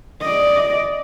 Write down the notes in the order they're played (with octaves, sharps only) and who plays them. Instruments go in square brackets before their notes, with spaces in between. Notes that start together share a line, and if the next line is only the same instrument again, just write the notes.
[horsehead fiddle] D5 D#5